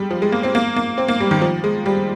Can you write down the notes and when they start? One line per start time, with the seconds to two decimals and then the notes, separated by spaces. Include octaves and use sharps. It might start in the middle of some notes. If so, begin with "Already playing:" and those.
Already playing: G3 G#3
0.11 F3
0.22 G#3
0.32 A#3
0.43 C4
0.55 A#3
0.76 A#3
0.98 C4
1.08 A#3
1.20 G3
1.31 D#3
1.41 F3
1.64 G#3
1.86 G3